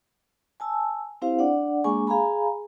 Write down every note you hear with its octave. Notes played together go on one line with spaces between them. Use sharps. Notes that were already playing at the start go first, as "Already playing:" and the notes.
G#5 A5 E6
C4 E4 G4 C5 F5
D4 D5 F#5
G#3 A#3 D4 G#4 G#5 C#6
G#4 F5 G#5 A#5 B5